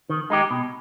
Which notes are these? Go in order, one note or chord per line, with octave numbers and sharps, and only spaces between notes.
D#3
G#3 D#4 G4
B2